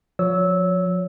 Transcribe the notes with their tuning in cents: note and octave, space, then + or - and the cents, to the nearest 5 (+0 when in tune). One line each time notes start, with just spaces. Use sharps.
F3 +40 C#5 +25 E6 -15